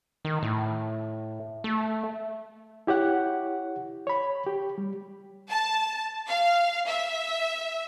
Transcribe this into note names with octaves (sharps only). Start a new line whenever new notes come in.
D#3
A2
A3
E4 G4 C#5 F#5
C#5 B5
G4
G3
A5
F5
E5